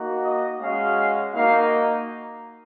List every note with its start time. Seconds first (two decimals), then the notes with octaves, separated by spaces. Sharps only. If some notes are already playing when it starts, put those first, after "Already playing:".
Already playing: A#3 D#4 F#4
0.23 D#5
0.60 G#3 C#4 F#4 F5
1.34 A#3 D#4 F#4 F5